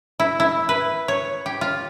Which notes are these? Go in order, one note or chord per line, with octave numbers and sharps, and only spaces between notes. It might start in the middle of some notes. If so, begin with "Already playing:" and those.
E4
E4
B4
C#5
G4
F4